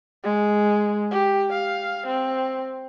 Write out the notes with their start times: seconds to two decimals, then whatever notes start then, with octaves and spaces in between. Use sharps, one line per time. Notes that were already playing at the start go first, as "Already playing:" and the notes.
0.23 G#3
1.11 G4
1.53 F5
2.07 C4